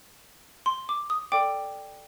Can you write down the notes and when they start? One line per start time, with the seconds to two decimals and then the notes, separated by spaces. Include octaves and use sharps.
0.66 C6
0.89 D6
1.10 D#6
1.32 A4 D5 G5 D6